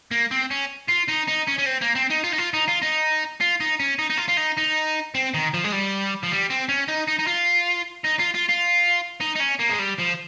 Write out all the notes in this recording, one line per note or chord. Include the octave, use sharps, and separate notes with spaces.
A#3
C4
C#4
F4
D#4
D#4
C#4
C#4
C4
A#3
C4
D#4
F4
D#4
F4
D#4
F4
D#4
F4
D#4
C#4
D#4
D#4
F4
F4
D#4
D#4
C4
D#3
F3
G#3
G3
F3
G3
C4
C#4
D#4
D#4
D#4
F4
D#4
F4
F4
F4
D#4
D#4
C#4
A#3
G#3
G3
F3